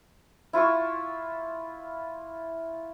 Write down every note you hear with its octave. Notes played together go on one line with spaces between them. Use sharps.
E4 F4 C6 C#6